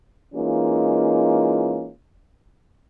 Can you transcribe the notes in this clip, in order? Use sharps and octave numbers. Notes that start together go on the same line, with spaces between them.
E3 G#3 A#3 C#4 D#4 F4